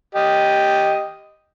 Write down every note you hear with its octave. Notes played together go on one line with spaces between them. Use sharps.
G4 D#5